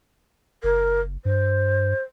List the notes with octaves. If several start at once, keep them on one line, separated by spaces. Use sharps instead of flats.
F#1 A#4
G2 C5